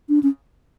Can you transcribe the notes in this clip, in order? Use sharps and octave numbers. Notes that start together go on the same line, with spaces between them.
D4
C#4